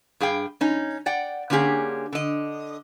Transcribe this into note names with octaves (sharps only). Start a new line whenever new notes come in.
G2 G#4 F5 G5
C#4 D#4
D5 F#5 G5
D3 A#3 C#4 G4 G#4
D3 D#5